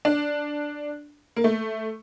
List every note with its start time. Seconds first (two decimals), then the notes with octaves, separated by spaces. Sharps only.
0.05 D4
1.36 A#3
1.44 A3